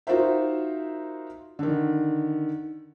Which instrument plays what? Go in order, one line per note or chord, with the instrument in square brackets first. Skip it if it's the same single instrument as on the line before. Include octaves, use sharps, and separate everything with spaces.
[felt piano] D#4 F4 F#4 A#4 C5 E5
D3 D#3